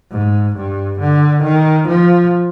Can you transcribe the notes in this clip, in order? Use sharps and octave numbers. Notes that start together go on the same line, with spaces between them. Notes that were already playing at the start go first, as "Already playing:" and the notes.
G#2
G2
D3
D#3
F3